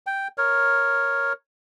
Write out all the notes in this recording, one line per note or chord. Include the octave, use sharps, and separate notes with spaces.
G5
A#4 C#5